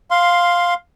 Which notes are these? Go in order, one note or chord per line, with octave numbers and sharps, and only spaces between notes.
F5 C6